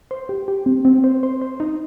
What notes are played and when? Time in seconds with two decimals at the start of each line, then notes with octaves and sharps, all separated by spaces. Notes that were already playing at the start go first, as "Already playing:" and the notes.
0.11 C5
0.29 G4
0.48 G4
0.66 C4
0.85 C4
1.04 C5
1.23 C5
1.41 C5
1.60 D#4